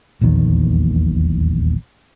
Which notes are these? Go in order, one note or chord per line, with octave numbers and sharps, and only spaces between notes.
D#1 A#1 E2 D#3